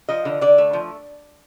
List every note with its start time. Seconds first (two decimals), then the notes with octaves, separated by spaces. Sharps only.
0.09 F3 D#5
0.25 D3
0.41 D3 D5
0.58 A3
0.73 F3